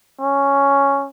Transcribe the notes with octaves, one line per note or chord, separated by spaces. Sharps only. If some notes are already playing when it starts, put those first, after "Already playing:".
C#4